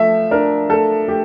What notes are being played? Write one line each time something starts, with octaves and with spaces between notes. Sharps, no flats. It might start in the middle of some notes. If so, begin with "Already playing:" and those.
Already playing: F3 A3 E5
D4 A#4
A3 A4
A3 G4